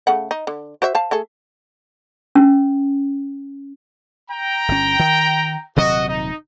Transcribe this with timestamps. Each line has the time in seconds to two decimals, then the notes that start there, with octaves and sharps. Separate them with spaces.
0.07 C#3 A3 F#5
0.31 D#4
0.47 D3
0.82 F#4 C5 E5
0.95 C5 F5 A5
1.11 A3 G#4 A4
2.35 C#4
4.30 G5 A#5
4.68 G1 C#4
4.99 D#3
5.76 D#1 C3 F#3 F#4 D#5
6.08 D#4